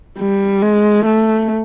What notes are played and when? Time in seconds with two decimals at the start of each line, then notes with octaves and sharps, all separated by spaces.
0.19 G3
0.62 G#3
1.06 A3